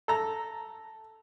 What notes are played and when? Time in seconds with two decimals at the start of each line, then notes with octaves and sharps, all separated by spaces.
0.08 A4 A#5